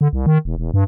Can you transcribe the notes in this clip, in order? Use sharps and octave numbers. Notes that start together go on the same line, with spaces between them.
D3
C2
D#3
E1
E1
G2